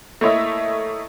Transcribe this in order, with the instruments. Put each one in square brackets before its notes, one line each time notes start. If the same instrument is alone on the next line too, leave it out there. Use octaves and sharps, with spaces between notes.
[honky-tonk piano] A3 A#3 E4 C#5 D#5 E5